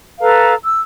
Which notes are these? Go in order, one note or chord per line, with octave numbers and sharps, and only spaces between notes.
A4 B4 F5 A#5
E6